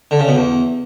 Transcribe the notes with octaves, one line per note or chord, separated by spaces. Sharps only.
D3
C#3
B2
E2